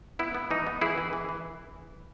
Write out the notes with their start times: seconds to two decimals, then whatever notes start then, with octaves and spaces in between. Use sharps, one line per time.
0.19 B3 E4
0.35 B3
0.51 E3 D#4
0.67 B3
0.81 E3 E4 G#4
0.98 E3
1.13 E3
1.29 E3